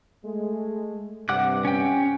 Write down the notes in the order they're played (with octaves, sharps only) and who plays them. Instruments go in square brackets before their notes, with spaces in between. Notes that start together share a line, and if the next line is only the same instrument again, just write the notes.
[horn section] G#3 A3
[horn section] G2 C3 [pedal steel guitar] F#5 D6 F#6
[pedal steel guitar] C#4 G5